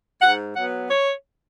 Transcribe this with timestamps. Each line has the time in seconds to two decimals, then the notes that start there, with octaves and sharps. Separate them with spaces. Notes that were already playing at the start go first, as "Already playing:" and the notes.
0.22 G#2 F#5
0.55 F#3 B3 F#5
0.90 C#5